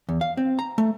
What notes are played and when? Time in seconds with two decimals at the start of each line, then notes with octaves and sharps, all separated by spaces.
0.09 E2
0.21 F5
0.37 C4
0.59 A#5
0.78 A3